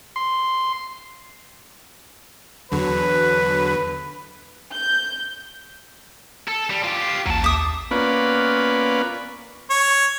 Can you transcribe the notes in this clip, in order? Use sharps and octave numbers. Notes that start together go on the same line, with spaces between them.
C6
E2 D3 F#3 B4
G6
A4
G3
F4 G4
C7
A1 D#2 F#3 A5
E5 D6 D#6
A#3 B3 C#4 F4 B4 D5
C#5